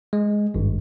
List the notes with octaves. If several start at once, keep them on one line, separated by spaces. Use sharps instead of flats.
G#3
G#1 G2